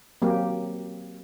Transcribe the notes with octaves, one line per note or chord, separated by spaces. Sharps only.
F#3 A#3 C4 G4